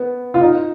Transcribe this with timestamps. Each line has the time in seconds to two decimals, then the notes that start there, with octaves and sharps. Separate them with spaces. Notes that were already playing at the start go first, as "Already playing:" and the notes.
Already playing: B3
0.34 F4
0.41 D#4